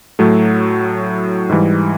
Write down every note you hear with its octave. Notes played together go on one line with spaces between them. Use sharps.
A2 F#3 A3
G#2 E3 G3